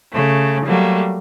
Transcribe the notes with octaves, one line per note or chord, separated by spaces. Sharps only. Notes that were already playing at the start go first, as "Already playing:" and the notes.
C#3 A3
F#3 G3 A3 A#3